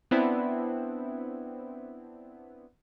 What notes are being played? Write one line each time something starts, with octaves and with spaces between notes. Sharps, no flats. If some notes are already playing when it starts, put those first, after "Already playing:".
B3 C4 D4 E4